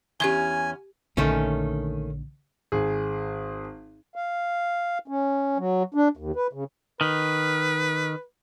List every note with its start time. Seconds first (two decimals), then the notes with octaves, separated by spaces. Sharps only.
0.20 E2 C#4 G4 G#5 G#6 G7
1.17 A#1 D3 D#3 A3 C#4
2.72 G#1 G#4
4.16 F5
5.08 C#4
5.58 F#3
5.94 D4
6.17 D#2
6.36 B4
6.53 C#3
7.01 D#3 B4